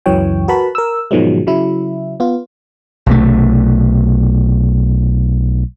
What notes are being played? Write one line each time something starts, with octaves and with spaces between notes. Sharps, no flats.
C#2 F#2 E3 F#3 C#5 G5
F#4 A#4 B4 A5 B5
A#4 E6
G#2 B2 D#3 F3 F#3 G#3
C#3 F#3 E4
B3 F4
B1 C3 A3